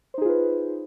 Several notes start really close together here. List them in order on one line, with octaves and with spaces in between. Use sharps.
C5 D#4 G#4 F4 B4